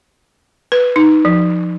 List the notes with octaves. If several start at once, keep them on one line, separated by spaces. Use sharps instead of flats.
B4
D#4
F3